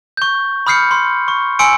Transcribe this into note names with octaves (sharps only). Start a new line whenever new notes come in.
C#6 G6
B5 D#6 F6 G6 C7 C#7
C6
C#6
G#5 C6 E6 C#7 D7